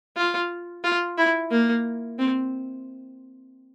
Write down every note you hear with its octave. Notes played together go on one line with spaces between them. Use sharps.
F4
F4
E4
A#3
C4